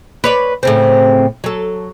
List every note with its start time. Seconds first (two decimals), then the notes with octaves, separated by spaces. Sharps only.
0.24 B4 C#5 D5
0.63 A2 C#3 C4
1.44 F#3 A4